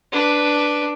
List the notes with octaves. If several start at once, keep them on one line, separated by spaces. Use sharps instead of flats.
D4 B4